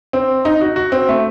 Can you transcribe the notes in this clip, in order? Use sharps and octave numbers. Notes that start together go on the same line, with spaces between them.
C4
D#4
F#4
F#4
C4
A3